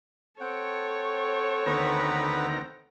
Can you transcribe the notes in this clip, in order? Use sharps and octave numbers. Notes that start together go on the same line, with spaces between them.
C4 A4 C#5 F#5 G5
D2 D#3 B3 B4 A#5